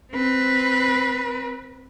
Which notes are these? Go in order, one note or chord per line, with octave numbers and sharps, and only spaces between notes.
C4 B4